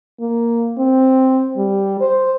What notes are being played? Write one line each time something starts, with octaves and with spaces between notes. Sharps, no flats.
A#3
C4
G3
C5